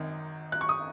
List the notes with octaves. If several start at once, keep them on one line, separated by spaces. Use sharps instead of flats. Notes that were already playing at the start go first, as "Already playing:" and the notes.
Already playing: G#1 F#2 D#3
F#6
C#6
D#6